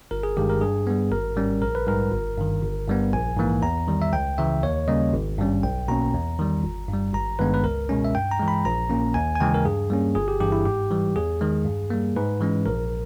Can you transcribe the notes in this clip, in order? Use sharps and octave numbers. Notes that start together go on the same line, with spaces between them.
G1 A#4
G#4
G2 D#3 G#3 G4
A#4
G2 G#4
G3 B3
G#1 A#4
G#2 G3 C#4
A#1 A#4
B4
G#2 G3 A#4
G1
G2 D#3
G1
G2 G3 B3
A#1 G#5
G#2 E3 A#3
E2 A#5
D#3 G3
E5
C#2 G5
C#3 E3 E5
D#2 C#5
C#3 G3 A#3 C#4 D#5
G#1
G2 G3 C#4
B1 G5
B2 A#3 C#4 A#5
E2
D#3 G3
G1
G2 G3
G#1 A#5
G2 D#3 G#3 B3 B4
B4
C#2 A#4
B2 G#3 C#4
E5
G2 G5
A#5
E3 G#3
B5
A#1 A#5
A#2 A#3 C#4
D#2 G#5
G#5
C#3 E3 G#3 G5
A#4
G2 G#4
G3 A#3 C#4
G1 G#4
G4
G2 E3 G4
E4
G#2 G4
E3 G3
E2 G#4
D#3 G#3
G2
G3 A#3
G#2 B4
E3 G#3 C#4
A#1 A#4